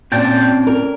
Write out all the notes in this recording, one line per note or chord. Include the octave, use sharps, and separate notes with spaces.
A#2 C4 C#4 C#5 D5 G5 A5
A#4